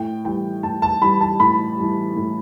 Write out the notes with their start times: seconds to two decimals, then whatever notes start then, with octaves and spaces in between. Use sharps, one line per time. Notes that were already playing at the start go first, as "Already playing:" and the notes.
Already playing: A2 G5
0.25 E3 G3 G5
0.63 A2 A5
0.82 A5
1.02 E3 G3 B5
1.21 A5
1.40 A2 B5
1.78 E3 G3
2.16 A2